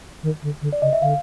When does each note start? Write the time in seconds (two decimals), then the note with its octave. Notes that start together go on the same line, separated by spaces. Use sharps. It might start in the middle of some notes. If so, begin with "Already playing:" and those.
0.23 D#3
0.43 D3
0.62 D3
0.73 D5
0.82 C#3 D#5
0.93 E5
1.01 D3 F5